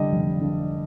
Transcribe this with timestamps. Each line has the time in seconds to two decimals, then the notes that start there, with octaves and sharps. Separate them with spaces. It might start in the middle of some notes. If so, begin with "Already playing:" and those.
Already playing: D3 G3 D#5
0.12 F1
0.41 D3